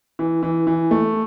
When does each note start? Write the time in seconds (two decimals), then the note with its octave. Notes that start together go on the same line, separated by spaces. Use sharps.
0.19 E3
0.43 E3
0.67 E3
0.91 A3